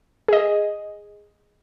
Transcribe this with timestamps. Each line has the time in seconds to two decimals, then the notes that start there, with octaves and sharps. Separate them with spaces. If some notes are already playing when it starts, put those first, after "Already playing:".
0.28 G#4 D#5